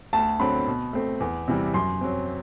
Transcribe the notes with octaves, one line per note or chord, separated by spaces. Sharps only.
D2 A5
D3 F#3 C4 B5
B2
A3 C4
E2
C3 E3 G3
F#2 C6
F#3 C4